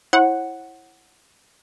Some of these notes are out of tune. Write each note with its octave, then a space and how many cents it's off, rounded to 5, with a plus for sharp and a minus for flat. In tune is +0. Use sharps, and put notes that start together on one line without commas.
E4 +0 C#5 -45 F#5 +0